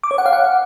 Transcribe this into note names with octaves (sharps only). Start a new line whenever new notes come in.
D6
C#5
F#5
F5
F#5